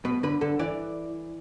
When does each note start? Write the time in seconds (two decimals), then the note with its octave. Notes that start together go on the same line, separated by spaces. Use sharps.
0.05 B2 B4
0.23 D3 B4
0.41 D3 A4
0.59 E3 D5